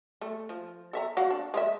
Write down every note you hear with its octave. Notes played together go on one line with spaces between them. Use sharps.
A3
F3
A4 E5 A#5
F#4 F5 F#5
D4
G#3 B4 E5